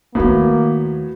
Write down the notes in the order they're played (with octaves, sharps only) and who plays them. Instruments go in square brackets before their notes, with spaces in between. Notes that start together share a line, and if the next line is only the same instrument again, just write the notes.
[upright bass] D#2 D#3 [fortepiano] A2 F#3 B3 [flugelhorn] A#3